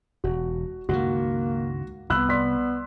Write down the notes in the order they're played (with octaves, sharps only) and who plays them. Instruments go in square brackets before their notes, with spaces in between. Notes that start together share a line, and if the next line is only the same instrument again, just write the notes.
[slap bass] E1 [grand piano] F#4
[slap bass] C#2 G2 D#3 [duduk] A#3 [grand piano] F#4
[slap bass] C2 [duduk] B3 [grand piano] B5 E6 F#6
[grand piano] D5 C6 B6